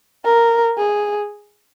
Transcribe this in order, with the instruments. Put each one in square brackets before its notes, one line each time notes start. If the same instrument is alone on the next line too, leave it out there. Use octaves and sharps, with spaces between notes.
[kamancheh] A#4
G#4